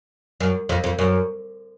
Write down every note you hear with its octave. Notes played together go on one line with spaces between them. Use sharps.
F#2
F2
F2
F#2